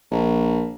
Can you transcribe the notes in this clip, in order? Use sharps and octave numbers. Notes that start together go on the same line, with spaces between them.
A#1